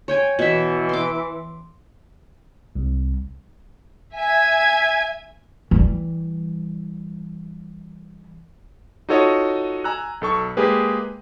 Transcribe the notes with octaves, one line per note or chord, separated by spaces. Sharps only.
C#5 G5 G#5
B2 E3 E5
C6 D6
C2
E5 G#5 G#6
E3 G3
D#4 F4 F#4 A4 C#5 D#5
G#5 A#5 E6 F#6
B1 A4 C#6
G#3 A#3 G4 G#4 B4